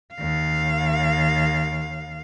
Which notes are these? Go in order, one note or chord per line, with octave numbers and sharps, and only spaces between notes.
D#2 F5